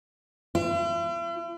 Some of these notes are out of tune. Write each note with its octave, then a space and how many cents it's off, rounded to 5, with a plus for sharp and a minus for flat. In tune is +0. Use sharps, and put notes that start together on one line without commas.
E4 +45